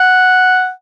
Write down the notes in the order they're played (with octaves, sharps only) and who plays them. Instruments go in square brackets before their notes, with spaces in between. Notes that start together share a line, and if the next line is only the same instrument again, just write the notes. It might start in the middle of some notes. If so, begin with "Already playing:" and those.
Already playing: [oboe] F#5